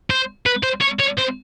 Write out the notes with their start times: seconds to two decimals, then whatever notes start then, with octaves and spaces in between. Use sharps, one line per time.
0.10 C5
0.46 B4
0.63 C5
0.81 C#5
0.99 C#5
1.18 C5